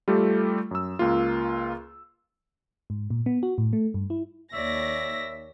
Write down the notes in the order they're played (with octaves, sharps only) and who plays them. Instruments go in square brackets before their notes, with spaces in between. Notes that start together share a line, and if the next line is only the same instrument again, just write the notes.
[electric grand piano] G3 A3 F4 G4 A4
F#2 E6
C#2 A#3 F4
[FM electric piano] G#2
A#2
B3
F#4
A2
A3
G2
E4
[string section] D#2 A#6 [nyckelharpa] C#5 D5 [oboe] E5